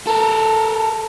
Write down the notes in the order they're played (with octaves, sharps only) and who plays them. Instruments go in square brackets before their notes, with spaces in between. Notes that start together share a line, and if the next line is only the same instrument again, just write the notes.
[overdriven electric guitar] A4 A#4